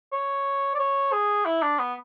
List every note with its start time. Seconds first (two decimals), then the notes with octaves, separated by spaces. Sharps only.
0.13 C#5
0.75 D5
0.79 C#5
1.12 G#4
1.46 E4
1.63 D4
1.79 B3